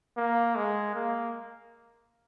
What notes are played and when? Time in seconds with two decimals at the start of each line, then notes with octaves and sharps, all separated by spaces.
0.17 A#3
0.56 G#3
0.95 A#3